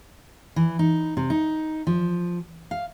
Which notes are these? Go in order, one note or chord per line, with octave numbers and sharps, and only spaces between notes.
E3
D#4
C3
D#4
F3
F5